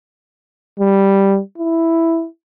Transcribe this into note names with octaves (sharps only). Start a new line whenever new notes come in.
G3
E4